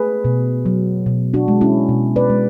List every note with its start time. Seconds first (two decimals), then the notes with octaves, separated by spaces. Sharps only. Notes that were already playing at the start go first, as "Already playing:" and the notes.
Already playing: A3 G#4 B4
0.25 B2
0.66 F#3
1.06 B2
1.34 D4 F#4
1.48 G#3
1.61 C#4 E4
1.89 B2
2.16 B4 D5
2.30 G#3